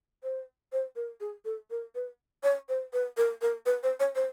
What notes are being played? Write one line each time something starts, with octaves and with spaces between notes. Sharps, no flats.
C5
C5
A#4
G#4
A4
A#4
B4
C#5
C5
B4
A#4
A#4
B4
C5
C#5
C5